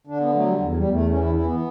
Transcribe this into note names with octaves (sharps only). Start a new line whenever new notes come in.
D3 D4
B3
F#3 A3
G3
E2 F#3
F#3
G3
E2
A3
E3 C#4
E4
D4
E3 E4
B3